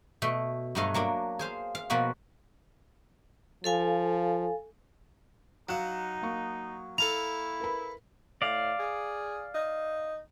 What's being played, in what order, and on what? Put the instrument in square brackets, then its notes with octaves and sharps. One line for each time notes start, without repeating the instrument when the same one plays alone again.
[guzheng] B2 A3
G2 B2 F#3 A3 D#5 F5
F#3 A#3 D4
G#4 C5 F5
F5
B2 F3 A#3 B3 F#4
[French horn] F3 [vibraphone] A4 F5 G#5
[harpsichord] F#3 F#5 [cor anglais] D#4 [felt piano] F5 F#6 E7
[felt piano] A#3 C#6
[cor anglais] E4 [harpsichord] A4 F5 A#5 [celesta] F7
[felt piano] A#4 B4 B5
[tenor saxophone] A2 [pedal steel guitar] D5 F5
[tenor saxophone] G#4
D#4